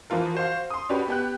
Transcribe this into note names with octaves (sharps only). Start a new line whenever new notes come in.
E3 F3 F4 A#4
F#4 C5 F5
C6 D#6
C#4 D4 F#4 G4 B4
B3 G4 F#6